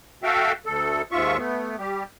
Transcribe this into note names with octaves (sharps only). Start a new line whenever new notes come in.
F#4 A4 E5 F5 G5
D2 A4
D#2 G#2 F4 E5 C#6
A3 B3
G3 G4